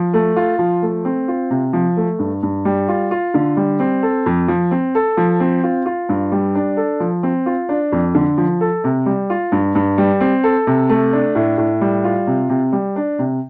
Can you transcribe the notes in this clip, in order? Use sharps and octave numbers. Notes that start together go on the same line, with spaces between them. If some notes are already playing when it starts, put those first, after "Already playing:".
Already playing: F3
A3
F4
F3
A3
C4
F4
C3
F3
A3
G2
G2
G3
F4
F4
D3
G3
C4
A4
F2
F3
C4
A4
F3
C4
F4
F4
G2
G3
D4
A4
F3
C4
F4
D4
F2
D3
F3
A4
C3
G3
F4
G2
G2
G3
C4
A4
C3
A3
D4
A2
A2
G3
F4
C3
C3
G3
D4
C3